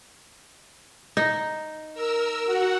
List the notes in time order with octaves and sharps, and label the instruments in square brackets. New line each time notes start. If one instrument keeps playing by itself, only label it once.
[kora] D#4
[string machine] A#4 E6
F#4 F#5